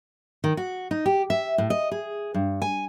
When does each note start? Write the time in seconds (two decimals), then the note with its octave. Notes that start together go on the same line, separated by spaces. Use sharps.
0.44 D#3
0.57 F#4
0.91 D#4
1.06 G4
1.30 E5
1.58 A2
1.70 D#5
1.91 G#4
2.34 G2
2.62 G#5